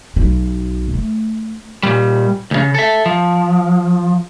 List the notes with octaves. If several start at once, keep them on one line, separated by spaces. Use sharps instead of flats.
B1 B2
A3
A#2 G3
D2 C#3
A4 E5
F3